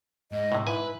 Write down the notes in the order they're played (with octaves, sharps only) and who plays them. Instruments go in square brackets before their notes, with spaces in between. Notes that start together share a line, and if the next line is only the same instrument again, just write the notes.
[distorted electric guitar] G#2 [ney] D#5
[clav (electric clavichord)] A2 C3
[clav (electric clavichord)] G#2 G#5 [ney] E4 [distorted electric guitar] B4